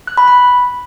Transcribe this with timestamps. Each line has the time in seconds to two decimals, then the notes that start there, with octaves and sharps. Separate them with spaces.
0.07 F#6
0.18 B5
0.28 B5